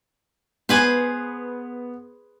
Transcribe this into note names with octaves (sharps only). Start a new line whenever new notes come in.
B3 G#4 B4 C5